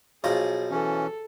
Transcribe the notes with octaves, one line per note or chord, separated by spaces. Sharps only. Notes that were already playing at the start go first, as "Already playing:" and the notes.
B1 F3 G#4 A#5
E3 C#4 A4